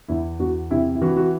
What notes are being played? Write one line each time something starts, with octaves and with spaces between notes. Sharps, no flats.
E2 E4
E2 F#4
C3 E4
E4
E3 F#4
F#4